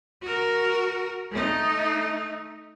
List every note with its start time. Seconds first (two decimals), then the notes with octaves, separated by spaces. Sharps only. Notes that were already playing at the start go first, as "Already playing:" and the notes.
0.21 F#4 A#4
1.31 A3 D#4